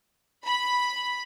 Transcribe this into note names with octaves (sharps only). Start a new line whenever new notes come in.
B5